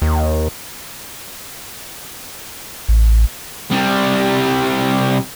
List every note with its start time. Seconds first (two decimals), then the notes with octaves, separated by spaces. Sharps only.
0.02 D#2
2.88 A1
3.71 C3 G3